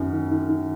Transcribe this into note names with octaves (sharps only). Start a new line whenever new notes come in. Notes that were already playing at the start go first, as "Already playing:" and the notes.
Already playing: F#2 D#3
D#3
D#3
D#3